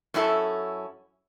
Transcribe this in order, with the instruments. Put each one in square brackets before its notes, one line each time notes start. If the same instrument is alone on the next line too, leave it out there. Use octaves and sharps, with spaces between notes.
[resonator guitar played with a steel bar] F#2 C#4 E4 G4 A4